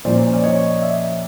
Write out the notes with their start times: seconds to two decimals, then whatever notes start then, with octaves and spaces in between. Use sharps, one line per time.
0.05 A#2 F3 A#3 C#4 C5 D5
0.33 D5
0.43 C#5 D#5
0.82 D5 E5